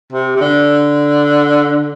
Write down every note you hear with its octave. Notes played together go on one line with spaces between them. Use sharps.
C3
C3
D3